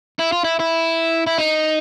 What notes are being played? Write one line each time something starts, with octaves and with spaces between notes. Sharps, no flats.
E4
F4
E4
E4
E4
D#4